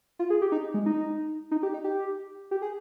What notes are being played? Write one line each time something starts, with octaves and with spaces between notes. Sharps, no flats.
F4
G#4
G4
D#4
G#3
D#4
D#4
G4
D#4
G4
G4
G#4